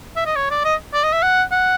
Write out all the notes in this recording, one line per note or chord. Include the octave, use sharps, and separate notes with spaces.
E5
D#5
C#5
D5
D#5
D5
D#5
E5
F#5
F#5